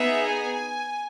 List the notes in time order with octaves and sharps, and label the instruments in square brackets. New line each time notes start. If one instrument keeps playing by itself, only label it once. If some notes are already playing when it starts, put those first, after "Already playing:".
Already playing: [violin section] B3 D#4 G#4 E5
G#5